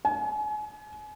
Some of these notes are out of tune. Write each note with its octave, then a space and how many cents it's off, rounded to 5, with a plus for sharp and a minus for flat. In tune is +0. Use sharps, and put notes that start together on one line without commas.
G#5 +35